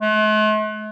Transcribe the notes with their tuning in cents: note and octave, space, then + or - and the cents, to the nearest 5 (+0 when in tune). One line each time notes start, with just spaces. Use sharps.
A3 -45